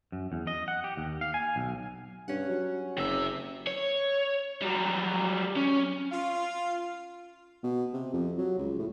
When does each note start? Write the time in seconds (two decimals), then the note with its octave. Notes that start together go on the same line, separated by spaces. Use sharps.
0.12 F#2
0.32 E2
0.47 D#5
0.68 F#5
0.84 G4
0.97 D#2
1.21 F5
1.34 G#5
1.56 B1
2.28 G2 C#4 F#5
2.49 F#3
2.97 F#1 C3 E5
3.67 C#5
4.62 F#3 G3
5.57 C#4
6.12 F4
7.64 B2
7.93 C3
8.13 F2
8.38 F#3
8.58 C#2
8.79 A2